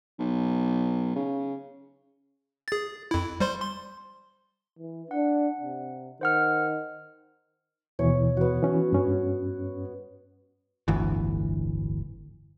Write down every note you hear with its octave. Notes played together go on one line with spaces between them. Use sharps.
B1
C#3
G#4 A6
F2 E4
G3 C5 C6
C6
E3
D4 F#5
C3
D#3 C5 F#5 F6
D#2 B2 E3 C#5
B3 F#4
E3 C#4
G2 C#4
D1 G1 D2 E3